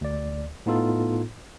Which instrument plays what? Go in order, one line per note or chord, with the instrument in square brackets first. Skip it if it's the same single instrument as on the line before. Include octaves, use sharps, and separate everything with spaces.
[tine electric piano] D2 D5
A2 B3 D#4 F4 A4